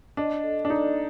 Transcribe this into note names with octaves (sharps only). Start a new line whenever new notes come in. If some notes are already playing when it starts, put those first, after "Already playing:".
D4 D#5
A4
D4
D#4 D5